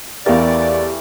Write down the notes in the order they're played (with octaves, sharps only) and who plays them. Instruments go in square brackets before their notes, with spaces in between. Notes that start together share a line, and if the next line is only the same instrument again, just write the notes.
[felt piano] E2 A#4 [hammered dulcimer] E3 G3 A3 [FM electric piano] G4 F5 [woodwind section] D5